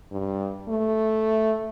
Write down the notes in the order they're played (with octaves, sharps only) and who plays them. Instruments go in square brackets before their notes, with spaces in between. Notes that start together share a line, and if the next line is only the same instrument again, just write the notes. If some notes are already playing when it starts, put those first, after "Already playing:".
[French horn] G2
A3